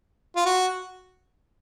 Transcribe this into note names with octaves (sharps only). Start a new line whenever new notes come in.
F4
F#4